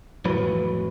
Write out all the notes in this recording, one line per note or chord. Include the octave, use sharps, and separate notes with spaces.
F2 A2 E3 F#3 B4